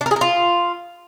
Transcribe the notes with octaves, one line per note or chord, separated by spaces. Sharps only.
D4
A#4
G#4
A#4
F4